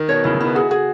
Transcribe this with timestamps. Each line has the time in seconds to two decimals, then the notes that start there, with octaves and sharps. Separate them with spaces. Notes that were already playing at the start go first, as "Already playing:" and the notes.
Already playing: D#3
0.09 B2 C#5
0.24 C#3 E4
0.35 C#3
0.41 B3 E4
0.55 F#4 G#4
0.71 F#4 G#4